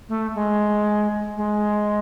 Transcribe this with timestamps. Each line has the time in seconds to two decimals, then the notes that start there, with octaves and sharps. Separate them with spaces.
0.09 A3
0.35 G#3
1.37 G#3